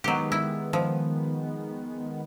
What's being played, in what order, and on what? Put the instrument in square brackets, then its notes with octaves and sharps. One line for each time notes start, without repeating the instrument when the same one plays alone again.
[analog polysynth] D#3 G#3 B3 [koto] F#3 G4
[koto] E4
F3